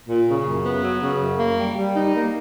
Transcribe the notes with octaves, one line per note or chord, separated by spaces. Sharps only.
A#2
C#3
F#2
B3
F#3
C#3
F#2
A#3
G3
G3
D#4
A#3